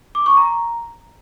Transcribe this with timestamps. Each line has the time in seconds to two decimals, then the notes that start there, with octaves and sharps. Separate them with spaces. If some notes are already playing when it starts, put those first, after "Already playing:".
0.15 D6
0.26 C#6
0.37 A#5